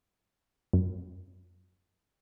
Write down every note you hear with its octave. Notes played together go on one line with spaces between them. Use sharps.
F#2